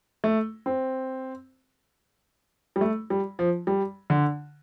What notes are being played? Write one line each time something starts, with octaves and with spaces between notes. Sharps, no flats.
A3
C4
G3
A3
G3
F3
G3
D3